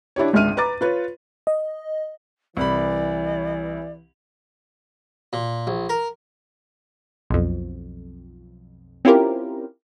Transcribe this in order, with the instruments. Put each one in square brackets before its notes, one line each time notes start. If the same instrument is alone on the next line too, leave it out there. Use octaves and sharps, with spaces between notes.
[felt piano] D4 E4 G4 C#5
G#1 C#2 D4 E5 F6 D#7
B4 A#5 D6 A6
F4 B4 C#5
[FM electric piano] D#5
[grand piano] C2 B5 [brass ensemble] E3 [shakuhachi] D5
[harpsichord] A#2
A#1
A#4
[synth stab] B1 F2
C4 C#4 E4 F4 G4 A#4